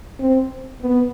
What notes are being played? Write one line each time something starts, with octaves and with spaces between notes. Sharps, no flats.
C4
B3